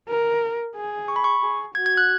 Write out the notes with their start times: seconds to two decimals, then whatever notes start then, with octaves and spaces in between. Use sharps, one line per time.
0.08 A#4
0.76 G#4
1.08 C#6
1.16 B5
1.24 C#6
1.42 G#4
1.75 F#4 G#6
1.86 G#6
1.97 F#6